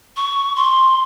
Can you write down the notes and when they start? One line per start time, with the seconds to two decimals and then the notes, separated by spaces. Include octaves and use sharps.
0.17 C#6
0.56 C6